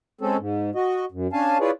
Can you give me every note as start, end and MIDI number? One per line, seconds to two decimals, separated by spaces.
0.21 0.37 56
0.21 0.37 60
0.21 0.37 61
0.21 0.37 69
0.39 0.70 44
0.75 1.05 66
0.75 1.05 75
1.12 1.27 42
1.33 1.58 61
1.33 1.58 62
1.33 1.58 77
1.33 1.58 80
1.33 1.58 81
1.60 1.71 64
1.60 1.71 65
1.60 1.71 68
1.60 1.71 71
1.60 1.71 73
1.60 1.71 74